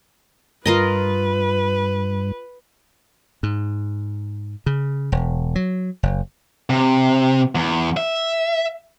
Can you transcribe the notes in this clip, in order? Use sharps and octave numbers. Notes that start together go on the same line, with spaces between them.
G2 F4 A#4 B4 D#5
G#2
C#3
E1
F#3
F#1
C3
E2
E5